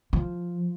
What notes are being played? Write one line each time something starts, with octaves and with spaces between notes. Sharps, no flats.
F3